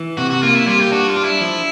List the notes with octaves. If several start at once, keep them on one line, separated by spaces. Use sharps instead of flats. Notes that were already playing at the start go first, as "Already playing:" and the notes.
Already playing: E3
C3 F#4
F#4
A#3 F4
E4
G3 F4
G4
D4 F#4
F4
D4
E4
F3